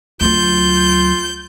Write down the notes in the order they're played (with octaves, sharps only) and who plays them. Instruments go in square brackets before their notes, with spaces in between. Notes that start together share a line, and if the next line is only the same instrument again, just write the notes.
[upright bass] D2 F#3 [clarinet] F4 [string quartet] G6